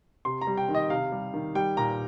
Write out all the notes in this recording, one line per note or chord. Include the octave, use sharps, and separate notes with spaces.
C3 C6
A#5
G3
G5
D#3
D#5
C3 F5
G3
D#3
G3 G5
A#2 A#5